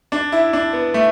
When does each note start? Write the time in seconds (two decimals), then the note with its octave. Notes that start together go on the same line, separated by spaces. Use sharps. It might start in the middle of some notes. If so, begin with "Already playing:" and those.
0.12 D4
0.32 E4
0.53 D4
0.73 B3
0.94 A3